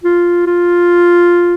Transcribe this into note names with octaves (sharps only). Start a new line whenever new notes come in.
F4
F4